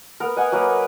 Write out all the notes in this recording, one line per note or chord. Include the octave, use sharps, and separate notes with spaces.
B3 A#4
D#5 F#5 G#5
F#3 A#3 A#4 B4